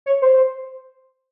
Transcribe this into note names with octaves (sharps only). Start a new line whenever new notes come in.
C#5
C5